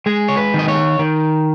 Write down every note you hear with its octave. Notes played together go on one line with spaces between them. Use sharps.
G#3 G#4
C#5
B4
D#3
D#5
C#5
D#3